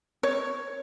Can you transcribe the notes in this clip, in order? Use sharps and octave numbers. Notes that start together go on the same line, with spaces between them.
C#5